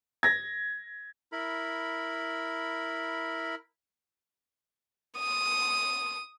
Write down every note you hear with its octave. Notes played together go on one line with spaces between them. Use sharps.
G#6 A#6
E4 A#4 B5
D#6